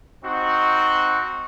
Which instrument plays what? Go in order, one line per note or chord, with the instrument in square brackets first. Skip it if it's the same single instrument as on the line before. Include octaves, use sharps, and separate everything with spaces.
[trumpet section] C4 D#4 F#4